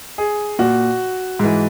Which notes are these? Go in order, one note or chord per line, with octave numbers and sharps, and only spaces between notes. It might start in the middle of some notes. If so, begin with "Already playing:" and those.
G#4
A#2 F#4
G#2 E3